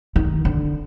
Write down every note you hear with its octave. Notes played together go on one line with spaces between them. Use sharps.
D#3
D3